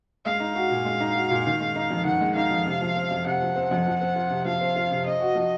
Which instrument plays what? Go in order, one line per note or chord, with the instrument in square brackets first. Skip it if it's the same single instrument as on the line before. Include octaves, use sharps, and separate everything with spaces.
[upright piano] G#3 [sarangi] F5
[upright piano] D#4
F#4
A#2
G#3
D#4
F#4
A#2
D#3
G#3
D#4
F2
[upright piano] D#3 [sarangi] F#5
[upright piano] G#3
[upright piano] D#4 [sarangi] F5
[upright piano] F2
C3
F3
C4
F2
[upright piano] C3 [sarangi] F#5
[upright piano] F3
C4
F2
F3
C4
F4
C3
[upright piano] F3 [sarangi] F5
[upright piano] C4
F4
C3
[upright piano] C4 [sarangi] D#5
[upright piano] F#4
F3